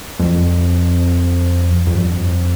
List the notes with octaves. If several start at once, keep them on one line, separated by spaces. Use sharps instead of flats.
F2
F2
G2
F2